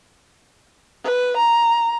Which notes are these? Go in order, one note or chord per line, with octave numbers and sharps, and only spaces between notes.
B4
A#5